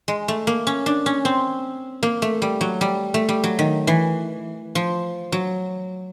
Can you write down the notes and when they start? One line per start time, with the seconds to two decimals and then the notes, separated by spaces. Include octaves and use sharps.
0.08 G#3
0.28 A3
0.47 A#3
0.67 C#4
0.86 D4
1.06 C#4
1.25 C4
2.03 A#3
2.22 A3
2.42 G3
2.61 F#3
2.81 G3
3.14 A3
3.29 G3
3.44 F#3
3.59 D#3
3.87 E3
4.75 F3
5.32 F#3